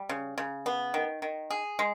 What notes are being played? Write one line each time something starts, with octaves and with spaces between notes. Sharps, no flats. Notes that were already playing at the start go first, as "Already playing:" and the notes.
Already playing: G3
C#3
C#3
B3
D#3
D#3
G#4
G#3